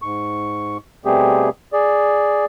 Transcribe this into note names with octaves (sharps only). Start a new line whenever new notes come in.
G#2 C#6
B2 G3 A3 C4 G4 G#4
G#4 D5